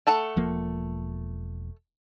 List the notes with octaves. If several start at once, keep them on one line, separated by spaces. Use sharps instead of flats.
A3 A4 F#5
E1 F3 A#3